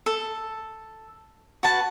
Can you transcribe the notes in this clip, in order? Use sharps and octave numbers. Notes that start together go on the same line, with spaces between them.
A4
F#4 B4 A5